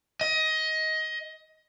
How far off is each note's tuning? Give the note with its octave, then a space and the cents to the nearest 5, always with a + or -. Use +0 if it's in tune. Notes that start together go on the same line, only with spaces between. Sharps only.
D#5 +20